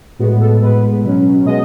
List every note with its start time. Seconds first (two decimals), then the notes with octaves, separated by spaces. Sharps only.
0.19 A2 G#3 B3 F#4
0.41 A4
0.62 A2 G#3 B3 B4
1.04 B2 F#3 C#4
1.46 B2 G#3 B3 D#5